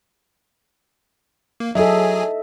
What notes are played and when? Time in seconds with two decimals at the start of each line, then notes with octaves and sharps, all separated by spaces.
1.60 A#3
1.75 F#3 G#4 A4 D#5 E5 G#5